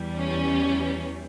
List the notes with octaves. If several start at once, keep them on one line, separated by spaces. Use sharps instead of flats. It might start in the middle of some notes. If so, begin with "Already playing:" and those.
Already playing: E2 E3 G3
C#4